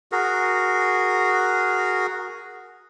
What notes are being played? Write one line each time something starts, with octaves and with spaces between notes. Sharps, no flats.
F#4 G#4 A#4